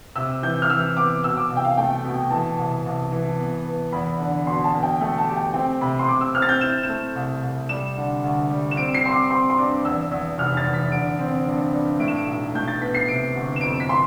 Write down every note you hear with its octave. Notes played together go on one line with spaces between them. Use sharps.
C3 E6
E3 G6
F6
E3 E6
B3 D6
B2 E6
D6
C2
G5
F5
A3 G5
B2
E3 A5
C2
C2
E3
B3
B3
E2 B5
D3
B2 C6
A5
B2
G5
A3 G5
A5
G4
G5
C4 G5
C3 B5
C6
C3 D6
E6
C4 F6
A6
G6
E4 E7
E7
A3
C2
C2
G3 E7
D3
D2
G3
E7
C4 D7
C7
C4 C6
D6
C4 C6
C6
G2 D6
E2 E6
E2 E6
F1 F6
A6
E2
B6
D3 D7
C4
G2
G2
A2 D7
E7
D7
B1
A2 G6
A6
B3 B6
C7
C3 D7
G1
E7
F2 D7
B6
C6